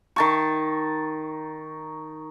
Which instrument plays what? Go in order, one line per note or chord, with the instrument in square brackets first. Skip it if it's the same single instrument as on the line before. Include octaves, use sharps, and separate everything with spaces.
[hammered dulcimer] D#3 A5 C#6